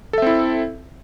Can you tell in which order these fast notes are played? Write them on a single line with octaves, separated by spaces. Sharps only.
A4 E5 C4 E4